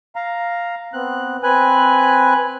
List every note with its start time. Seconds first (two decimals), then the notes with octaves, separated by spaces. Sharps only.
0.16 F5 A#5
0.94 B3 C4 F#6
1.43 C4 B4 G#5 F#6